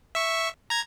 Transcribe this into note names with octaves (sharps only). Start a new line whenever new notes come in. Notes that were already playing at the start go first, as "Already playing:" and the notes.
E5 C#6
A#5 G#6